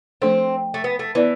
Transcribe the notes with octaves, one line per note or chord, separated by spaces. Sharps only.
F3 A3 C4 D4 A4 C5
A3
B3
A3
E3 B3 E4 B4 D5